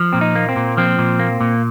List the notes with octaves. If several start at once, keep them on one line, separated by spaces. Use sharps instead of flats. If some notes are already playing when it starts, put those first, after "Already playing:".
Already playing: F3
A#2 C4
D#4
A#3
C4
A#2
F3 C4
A#2
A#3
A#2